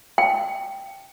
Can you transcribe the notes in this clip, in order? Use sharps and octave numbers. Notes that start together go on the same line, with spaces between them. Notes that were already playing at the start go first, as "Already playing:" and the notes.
G5